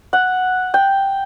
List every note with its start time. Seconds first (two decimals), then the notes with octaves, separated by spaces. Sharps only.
0.13 F#5
0.74 G5